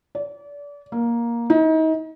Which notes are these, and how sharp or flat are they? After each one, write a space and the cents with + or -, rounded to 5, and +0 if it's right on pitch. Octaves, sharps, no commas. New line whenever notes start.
D5 -30
A#3 +10
D#4 +35